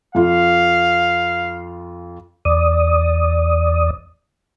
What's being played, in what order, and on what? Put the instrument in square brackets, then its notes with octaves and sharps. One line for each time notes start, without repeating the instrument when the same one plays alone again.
[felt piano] F2 F3 F4 [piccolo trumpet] F5
[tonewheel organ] E2 D5 D#6